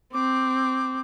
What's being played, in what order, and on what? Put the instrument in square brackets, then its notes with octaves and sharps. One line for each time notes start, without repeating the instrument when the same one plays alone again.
[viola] C4 [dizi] D6